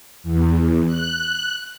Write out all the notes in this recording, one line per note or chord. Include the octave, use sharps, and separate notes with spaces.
E2
F#6